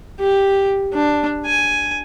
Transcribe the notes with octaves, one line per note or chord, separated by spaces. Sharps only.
G4
D4
G#5